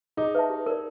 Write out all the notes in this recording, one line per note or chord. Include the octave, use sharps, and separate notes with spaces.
D#4 G#4
B4 E5 A5
G4
A#4 D5